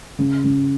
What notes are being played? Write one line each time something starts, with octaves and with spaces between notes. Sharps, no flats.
C#3
C#3